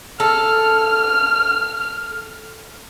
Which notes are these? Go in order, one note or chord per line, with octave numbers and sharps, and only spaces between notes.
A4 F6